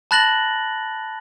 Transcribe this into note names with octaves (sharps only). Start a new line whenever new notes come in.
A5 B5 F#6 A6 A#6 F#7